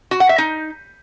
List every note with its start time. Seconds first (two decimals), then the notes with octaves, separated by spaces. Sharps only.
0.11 F#4
0.20 F#5
0.29 E5
0.38 D#4